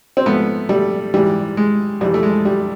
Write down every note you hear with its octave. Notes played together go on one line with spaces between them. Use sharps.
C4
G#2 F3 A3 B3
G3 A3
G#2 E3 G3
G#3
F2 C3 E3 G3
A3
G#3
G3